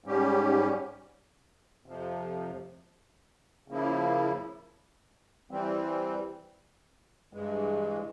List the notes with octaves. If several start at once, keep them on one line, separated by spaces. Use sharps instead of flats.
G#2 G3 C#4 G4
F2 C3 F3
C#3 F3 A#3 E4
E3 G3 C4
G2 E3 G#3